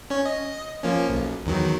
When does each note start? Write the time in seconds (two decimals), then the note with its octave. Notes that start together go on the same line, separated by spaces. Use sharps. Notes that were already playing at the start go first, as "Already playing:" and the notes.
0.10 C#4 C#5
0.25 D#5
0.83 F3 A#3 C#4
1.09 B1
1.46 E2 D#3 F#3